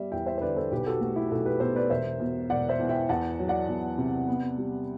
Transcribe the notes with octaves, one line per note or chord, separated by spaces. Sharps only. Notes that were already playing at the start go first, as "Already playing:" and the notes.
Already playing: G3 B3 D5 E5
E2 E5 G5
C5 E5
C5
D3 B4 D5
A4 C5
B1 G4 B4
F#4 A4
A3 F#4
E4 G4
B1 F#4 A4
G4 B4
B2 A4 C5
B4 D5
E1 C5 E5
B2
E1 D5 F#5
C5 E5
E2
E5 G5
E2 F#5 A5
F#3
D5 F#5
E2
C3
B3
G3